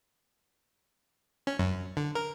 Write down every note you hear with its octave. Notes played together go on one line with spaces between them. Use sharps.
C#4
F#2
D3
A#4